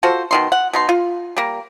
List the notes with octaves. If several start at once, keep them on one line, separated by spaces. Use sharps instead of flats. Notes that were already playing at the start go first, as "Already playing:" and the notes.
F4 F#4 A4 C5
B2 D#3 C6
F#5
B2 D#4 C6
F4
G3 A#3